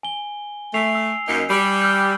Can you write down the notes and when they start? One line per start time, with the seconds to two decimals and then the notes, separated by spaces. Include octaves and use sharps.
0.03 G#5 G7
0.74 A3 G#5 C7 F7
0.95 E6
1.28 F#2 A#3 D#4
1.50 G3 B5 D6
1.82 E6 F6 G6